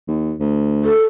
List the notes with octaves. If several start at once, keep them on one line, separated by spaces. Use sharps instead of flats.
D#2
D2
A4